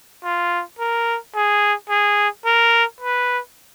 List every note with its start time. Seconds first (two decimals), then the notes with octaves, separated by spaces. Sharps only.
0.24 F4
0.79 A#4
1.35 G#4
1.89 G#4
2.45 A#4
3.00 B4